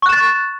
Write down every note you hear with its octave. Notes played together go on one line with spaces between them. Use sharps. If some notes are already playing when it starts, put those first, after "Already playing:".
C#6 F#6 A6 E7